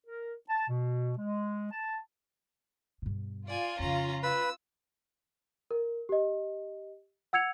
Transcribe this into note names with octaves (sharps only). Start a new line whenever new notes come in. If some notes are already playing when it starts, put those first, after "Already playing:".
A#4
A5
B2
G#3
A5
G2 B2
F4 D5 G#5
F2 C#3 C#4 A#5
B4 B5 E6
A#4
G4 D#5
F#5 E6 G#6 C#7 F7